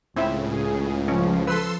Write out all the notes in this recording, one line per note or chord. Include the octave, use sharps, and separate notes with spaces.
C#2 A2 C#3 C4 E4 E5
G#4
F3 C#4
A4 B4 C6 E6